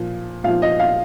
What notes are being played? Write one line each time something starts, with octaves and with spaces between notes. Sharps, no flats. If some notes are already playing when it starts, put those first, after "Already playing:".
Already playing: A#2 F3
A#2 F3 F5
D#5
F5